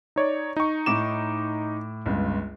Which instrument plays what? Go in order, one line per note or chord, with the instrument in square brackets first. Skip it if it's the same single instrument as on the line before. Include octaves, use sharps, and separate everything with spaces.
[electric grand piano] D#4 C#5 D5
D#4 C#6
[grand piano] A2 D6 E7
G1 C#2